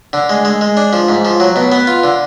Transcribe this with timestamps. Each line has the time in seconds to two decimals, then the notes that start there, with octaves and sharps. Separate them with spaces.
0.13 D3
0.29 G#3
0.45 G#3
0.61 G#3
0.77 D4
0.93 F3
1.09 G#2
1.25 F3
1.40 F#3
1.56 B2
1.72 B3
1.87 F4
2.04 D3